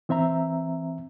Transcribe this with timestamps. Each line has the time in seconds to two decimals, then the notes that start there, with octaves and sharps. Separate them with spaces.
0.09 E3 C4 E5 A#5